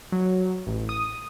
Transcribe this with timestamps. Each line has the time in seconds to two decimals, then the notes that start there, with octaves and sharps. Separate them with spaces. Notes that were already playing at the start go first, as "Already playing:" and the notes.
0.12 F#3
0.67 A1
0.89 D#6